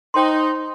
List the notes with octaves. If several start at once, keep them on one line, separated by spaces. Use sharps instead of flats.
D#4 C5 G5 C6